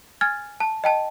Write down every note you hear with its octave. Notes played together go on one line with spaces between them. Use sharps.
G#5 F6 G#6 A6
A5
D#5 G5 A5